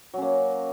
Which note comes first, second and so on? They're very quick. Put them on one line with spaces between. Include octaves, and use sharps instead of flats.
F#3 C#4 A#3